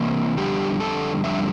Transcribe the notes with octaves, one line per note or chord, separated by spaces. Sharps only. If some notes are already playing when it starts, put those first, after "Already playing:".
Already playing: C3 E3 A#3 E4
F2 D3 G3 G4
A4
F2 D3 G3 E5